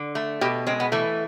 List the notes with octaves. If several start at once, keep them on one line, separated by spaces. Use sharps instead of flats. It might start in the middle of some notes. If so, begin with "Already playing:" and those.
Already playing: D3
A3
B2 G4
G#3 C4
B3
E3 A3